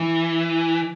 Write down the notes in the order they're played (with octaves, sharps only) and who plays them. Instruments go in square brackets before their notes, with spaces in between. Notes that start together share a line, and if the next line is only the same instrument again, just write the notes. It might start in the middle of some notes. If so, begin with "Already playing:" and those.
Already playing: [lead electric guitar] E3